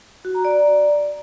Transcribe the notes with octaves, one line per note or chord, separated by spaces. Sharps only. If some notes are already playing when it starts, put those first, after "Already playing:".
F#4
A#5
D5